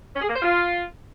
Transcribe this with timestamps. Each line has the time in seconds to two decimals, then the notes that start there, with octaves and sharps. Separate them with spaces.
0.15 C#4
0.22 G#4
0.28 A#3
0.35 C5
0.42 F4